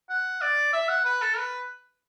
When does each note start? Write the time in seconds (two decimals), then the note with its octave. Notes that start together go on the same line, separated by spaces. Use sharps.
0.10 F#5
0.42 D5
0.73 E5
0.89 F#5
1.05 B4
1.22 A4
1.37 B4